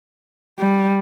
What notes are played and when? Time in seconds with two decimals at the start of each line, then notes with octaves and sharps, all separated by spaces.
0.59 G3